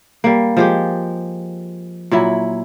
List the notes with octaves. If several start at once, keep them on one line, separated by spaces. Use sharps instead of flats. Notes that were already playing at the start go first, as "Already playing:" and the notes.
G3 A#3
F3 G#3 G4
A#2 F#3 E4